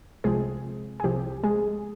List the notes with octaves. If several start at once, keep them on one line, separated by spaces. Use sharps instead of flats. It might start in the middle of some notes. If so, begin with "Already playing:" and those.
C2 C3 F3 G#3 C4 G#4
G#4
C2 C3 F3 C4 G4
G#3 G#4